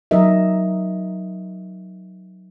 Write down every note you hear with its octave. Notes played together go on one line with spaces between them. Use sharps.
F#3 D#4 A#4 D#5 E5